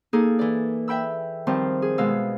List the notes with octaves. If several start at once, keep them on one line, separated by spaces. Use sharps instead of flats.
A#3 D#4 G#4 A4
E3 D5
E5 G5 B5 E6
D#3 F3 G3 C4
G#4
B2 G#3 F5 E6